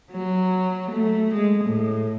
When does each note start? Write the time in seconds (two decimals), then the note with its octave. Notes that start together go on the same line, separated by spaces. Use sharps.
0.11 F#3
0.91 A3
1.34 G#3
1.64 A2